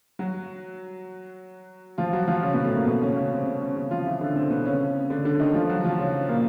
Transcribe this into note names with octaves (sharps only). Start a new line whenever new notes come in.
F#3 F#4
F3 F4
F#3 F#4
F3 F4
C#3 C#4
B2 B3
A2 A3
A#2 A#3
B2 B3
C#3 C#4
C#3 C#4
C3 C4
C#3 C#4
C#3 C#4
C#3 C#4
F3 F4
E3 E4
D3 D4
C3 C4
B2 B3
C#3 C#4
D3 D4
D3 D4
D#3 D#4
F3 F4
F#3 F#4
F#4
F3 F4
C#3 C#4
A#2 A#3